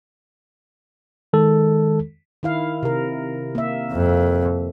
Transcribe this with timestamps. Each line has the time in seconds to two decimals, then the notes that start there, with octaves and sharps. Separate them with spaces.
1.33 D#3 G#3 A4
2.43 D#3 E4 F5
2.83 C3 A#4
3.55 A#3 E5
3.92 F2